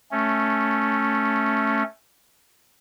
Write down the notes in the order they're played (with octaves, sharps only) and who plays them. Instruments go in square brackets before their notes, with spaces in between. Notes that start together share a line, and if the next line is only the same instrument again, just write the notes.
[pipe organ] A3 C#4